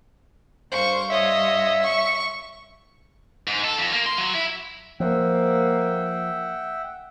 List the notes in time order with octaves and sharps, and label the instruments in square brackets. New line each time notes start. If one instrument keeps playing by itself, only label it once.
[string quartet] G2 F5 C6 [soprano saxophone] C5 [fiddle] C#6
[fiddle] C#5 D#5 [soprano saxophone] E5
[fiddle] C#6
[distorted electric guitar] G#2
A4
F2
A#3
C6
F#3
E4
[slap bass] F3 [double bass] A#3 [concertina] E5 F#5 G5